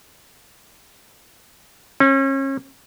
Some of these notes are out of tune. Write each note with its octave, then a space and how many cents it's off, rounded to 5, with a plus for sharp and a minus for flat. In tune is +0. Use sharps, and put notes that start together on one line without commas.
C#4 -35